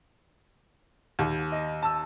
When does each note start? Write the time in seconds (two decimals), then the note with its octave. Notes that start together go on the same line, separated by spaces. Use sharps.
1.19 D#2
1.52 D#5
1.83 A5 E6